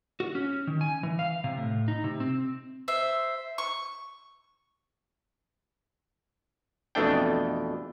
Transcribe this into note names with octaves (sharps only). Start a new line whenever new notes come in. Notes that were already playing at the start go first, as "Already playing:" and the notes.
F#4
C#4
D#3
G#5
E3
F5
C3
A2
D#4
C3
C4
C5 E5
C#6
F2 B2 E3 A3 D4 G5